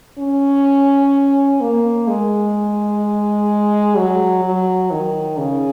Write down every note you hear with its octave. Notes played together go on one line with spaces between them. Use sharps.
C#4
A#3
G#3
F#3
F#3
D#3
C#3